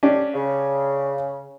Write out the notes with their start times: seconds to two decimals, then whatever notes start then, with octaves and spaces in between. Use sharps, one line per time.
0.03 C#4 D4 G4
0.34 C#3